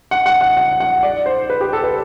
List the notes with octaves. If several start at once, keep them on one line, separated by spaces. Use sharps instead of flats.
F#5
F#5
F#5
F#5
F#5
D5
C5
B4
G4
A4
B4